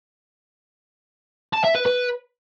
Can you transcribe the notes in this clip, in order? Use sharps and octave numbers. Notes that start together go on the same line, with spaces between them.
A5
E5
B4
B4